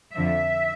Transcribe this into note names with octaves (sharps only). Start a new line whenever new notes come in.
F2 D3 F3 E5